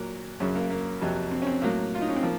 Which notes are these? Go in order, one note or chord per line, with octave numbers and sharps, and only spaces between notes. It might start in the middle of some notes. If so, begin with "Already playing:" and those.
Already playing: A#2 F#3 A#4
F#2 C#3 F#3 C#4
A#3
A#3
F2 C3 F#3
C4
C#4
C4
A2 F#3 A#3
F4
D#4
C#4
C4
F3 A#3